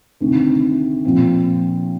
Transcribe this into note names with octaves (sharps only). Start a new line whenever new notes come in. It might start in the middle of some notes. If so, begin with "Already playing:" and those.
D2 C3 D#3 A3 C4
A#2 F3 C4